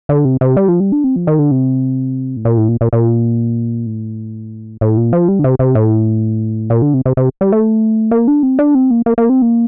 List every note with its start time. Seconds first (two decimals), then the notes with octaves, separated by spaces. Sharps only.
0.09 D3
0.25 C3
0.41 C3
0.57 G3
0.68 F3
0.80 G3
0.92 D4
1.04 C4
1.16 F3
1.27 D#3
1.39 D3
1.51 C3
2.36 A2
2.45 A#2
2.57 A2
2.68 A#2
2.81 A#2
2.93 A#2
3.86 A2
4.81 A2
4.97 A#2
5.13 F3
5.28 G3
5.39 D3
5.44 C3
5.59 C3
5.75 A2
6.70 A#2
6.82 D3
6.94 C3
7.05 C3
7.17 C3
7.41 G3
7.52 A3
8.11 A#3
8.28 D4
8.43 C4
8.59 D4
8.75 C4
8.90 A#3
9.06 A#3
9.18 A#3
9.29 C4
9.42 A#3